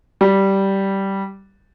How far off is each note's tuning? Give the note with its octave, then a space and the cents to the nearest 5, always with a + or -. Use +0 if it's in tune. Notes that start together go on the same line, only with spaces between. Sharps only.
G3 -10